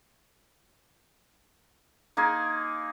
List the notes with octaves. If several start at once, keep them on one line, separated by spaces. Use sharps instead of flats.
A#3 D#4 G#4 C6